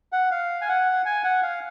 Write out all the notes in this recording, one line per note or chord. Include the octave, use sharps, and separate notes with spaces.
F#5
F5
G#5
F#5
G#5
F#5
F5